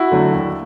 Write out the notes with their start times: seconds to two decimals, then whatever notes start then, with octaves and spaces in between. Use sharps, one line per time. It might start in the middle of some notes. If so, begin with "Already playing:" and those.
Already playing: E4 F#4
0.12 D3 F#3 A3
0.33 D#2